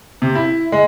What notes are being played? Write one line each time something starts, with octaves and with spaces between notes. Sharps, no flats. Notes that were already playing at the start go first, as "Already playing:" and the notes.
C3
E4
G#3